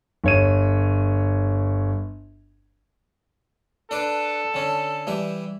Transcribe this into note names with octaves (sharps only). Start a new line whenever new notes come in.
G1 C#5 D#7
D4 A4 B4 D6
D3 C#4
E3 G3 E5